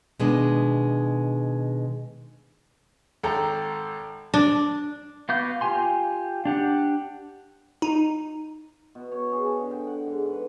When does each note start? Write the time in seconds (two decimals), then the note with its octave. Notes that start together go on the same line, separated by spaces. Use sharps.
0.19 B2 D#3 G#3 B3 D4
3.23 G#1 A4 G5 A#5
4.34 D4
5.29 B3 F#4 F5 D6 G6
5.61 F4 G4 G#5 C6
6.45 D4 G4 F#5
7.82 D#4
8.95 B2
9.11 C#5
9.32 G#4
9.46 A5
9.60 D3
9.71 G5
9.87 F#5
10.07 G#2
10.26 B4